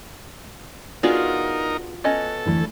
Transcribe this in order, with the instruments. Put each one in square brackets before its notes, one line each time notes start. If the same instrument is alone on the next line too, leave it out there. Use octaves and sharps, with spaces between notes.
[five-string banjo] B3 D4 G#4 [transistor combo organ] D#4 A#4 [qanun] F4 F#4
[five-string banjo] B3 C#4 D#5 [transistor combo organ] A4
[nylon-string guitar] D2 E3 A3